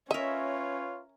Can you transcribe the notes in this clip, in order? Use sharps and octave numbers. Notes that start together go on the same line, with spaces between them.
C#4 F4 A#4 B4 C#5 D#5 E5